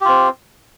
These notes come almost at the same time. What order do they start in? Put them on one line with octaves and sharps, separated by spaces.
G4 F4 C4